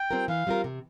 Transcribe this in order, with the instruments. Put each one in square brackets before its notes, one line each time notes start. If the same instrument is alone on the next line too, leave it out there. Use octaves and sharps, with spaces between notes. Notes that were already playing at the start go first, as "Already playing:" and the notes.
Already playing: [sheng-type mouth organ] G5
[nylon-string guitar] G3 C4 F4 A#4
[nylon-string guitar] E3 [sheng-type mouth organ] F5
[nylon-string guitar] G3 C4 F4 A#4
C3